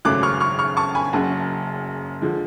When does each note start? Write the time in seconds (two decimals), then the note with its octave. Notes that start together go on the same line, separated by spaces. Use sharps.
0.05 G#1 F#2 C#3 F#3 A3 D6 F#6
0.23 C#6 F6
0.40 C#6 F6
0.59 C#6 F6
0.77 A5 C#6
0.95 G#5 B5
1.13 F#1 F#2 C#3 F#5 A5
2.21 D3 F3 G#3